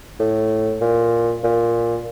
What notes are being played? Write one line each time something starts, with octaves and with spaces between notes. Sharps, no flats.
A2
A#2
A#2